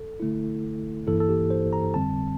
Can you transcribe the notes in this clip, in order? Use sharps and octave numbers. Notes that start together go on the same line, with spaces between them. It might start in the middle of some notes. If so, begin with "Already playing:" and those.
Already playing: A4
D3 A3 E4
G2 E3 A#3 E4 A4
A4
G4
C5
A#5
F2 D3 G3 C4 A5